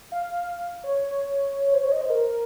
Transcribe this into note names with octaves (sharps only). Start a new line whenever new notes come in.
F5
C#5
C#5
C#5
C5
C#5
D#5
C5
A#4